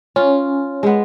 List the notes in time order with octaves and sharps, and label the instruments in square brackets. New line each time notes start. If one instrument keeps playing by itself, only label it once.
[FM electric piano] C#4 [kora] F4
[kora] G#3 B3